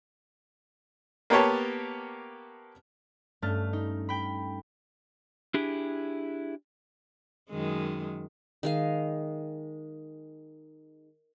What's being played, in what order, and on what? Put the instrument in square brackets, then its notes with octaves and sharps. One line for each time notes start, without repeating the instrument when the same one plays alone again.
[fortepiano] A#3 B3 G4 C#5 A5
[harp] G2 A3 C#4 F6 A6
D#4
G5 B5
[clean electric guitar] D4 E4 G4 G#4
[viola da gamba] F#2 D#3 G#3
[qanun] D#3 G#3 F5